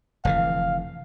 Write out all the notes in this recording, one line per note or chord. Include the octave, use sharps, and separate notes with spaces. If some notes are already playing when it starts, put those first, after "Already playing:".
F1 D3 E3 F5